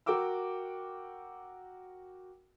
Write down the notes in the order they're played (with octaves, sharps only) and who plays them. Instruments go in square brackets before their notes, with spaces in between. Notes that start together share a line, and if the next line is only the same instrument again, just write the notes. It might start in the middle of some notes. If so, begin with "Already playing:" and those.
[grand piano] F#4 A#4 G5 D6 E6